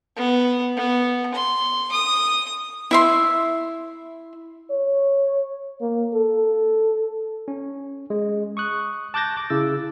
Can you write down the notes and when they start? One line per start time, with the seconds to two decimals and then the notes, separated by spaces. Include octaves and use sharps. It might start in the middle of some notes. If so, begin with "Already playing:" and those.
0.16 B3
0.76 B3
1.34 C6
1.92 D#6
2.91 E4 E5 C6
4.70 C#5
5.81 A#3
6.14 A4
7.48 C#4
8.10 G#3
8.57 C#6 D#6 F#6
9.14 A5 D6 F#6 G6 A6 A#6
9.37 D6
9.50 C#3 E4 E6 A6